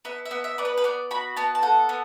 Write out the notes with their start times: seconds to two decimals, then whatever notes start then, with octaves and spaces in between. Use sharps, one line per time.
0.05 B3 E5
0.25 E5
0.31 B3
0.44 E5
0.58 B3 D5
0.65 B4
0.77 B4
0.84 B3 D5
1.11 F#4 B5
1.36 B3 A5
1.55 A5
1.63 A4 F#5
1.89 B3